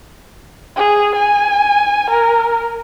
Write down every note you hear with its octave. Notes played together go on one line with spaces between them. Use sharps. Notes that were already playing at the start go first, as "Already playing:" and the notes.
G#4
G#5
A#4